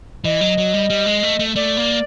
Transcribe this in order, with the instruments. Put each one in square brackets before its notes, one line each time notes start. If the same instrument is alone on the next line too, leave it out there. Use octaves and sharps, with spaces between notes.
[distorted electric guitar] E3 [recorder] D#5
[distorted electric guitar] F#3
F#3
G3
G3
G#3
A3
A3
[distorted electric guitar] A3 [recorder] D5
[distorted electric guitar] A#3